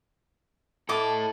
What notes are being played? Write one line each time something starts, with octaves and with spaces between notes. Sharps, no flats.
E4 A4 D#5 A5 D6